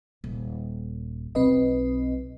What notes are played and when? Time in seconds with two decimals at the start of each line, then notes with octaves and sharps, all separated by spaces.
0.24 D#1
1.35 B1 C4 B4 D#5